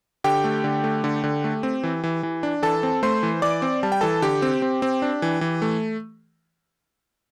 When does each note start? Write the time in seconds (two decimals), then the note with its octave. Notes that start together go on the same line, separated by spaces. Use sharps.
0.24 D3 G4 G5
0.44 A3
0.64 D3
0.84 A3
1.04 D3
1.24 D3
1.44 A3
1.63 C4
1.83 E3
2.04 E3
2.23 E3
2.43 D4
2.62 E3 A4 A5
2.83 C4
3.03 A3 C5 C6
3.23 E3
3.42 E3 D5 D6
3.62 C4
3.83 G3 A5
3.92 G5
4.01 E3 A4 A5
4.22 D3 G4 G5
4.42 C4
4.62 C4
4.82 C4
5.02 D4
5.22 E3
5.41 E3
5.62 A3